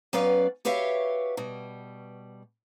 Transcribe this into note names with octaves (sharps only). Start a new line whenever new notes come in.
F#3 B3 C#4 B4 D5 F5
F#4 G4 B4 C#5 E5 F5
B2 G3